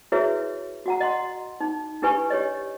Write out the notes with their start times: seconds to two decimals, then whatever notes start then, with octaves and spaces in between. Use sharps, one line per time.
0.12 E4 F#4 G#4 B4 C#5 E5
0.86 F#4 F#5 A#5
1.00 D#5 F#5 C6
1.60 D#4
2.02 D4 E4 G4 B4 G#5 C#6
2.30 G4 C#5 D#5